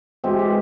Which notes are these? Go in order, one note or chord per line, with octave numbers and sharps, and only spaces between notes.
E3 G#3 C4 G4
G4